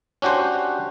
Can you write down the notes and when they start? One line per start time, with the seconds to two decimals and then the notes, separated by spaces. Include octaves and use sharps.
0.22 C#4 D4 F#4 G4 C5